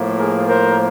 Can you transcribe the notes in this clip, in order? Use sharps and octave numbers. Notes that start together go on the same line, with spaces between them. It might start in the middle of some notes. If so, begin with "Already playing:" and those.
Already playing: A2 F3 A#3
G#4 A#4
A#4 C5